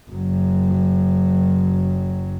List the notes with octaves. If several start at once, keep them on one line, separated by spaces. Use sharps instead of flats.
F#1 F#3